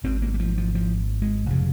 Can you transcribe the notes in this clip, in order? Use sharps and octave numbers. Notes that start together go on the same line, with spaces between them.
G#1 G#2 C4
A#3
G3
F3
F3
F3
G#3
F1 C#3